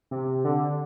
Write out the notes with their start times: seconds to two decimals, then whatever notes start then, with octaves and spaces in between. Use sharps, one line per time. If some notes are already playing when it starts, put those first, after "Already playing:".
0.11 C3
0.44 D3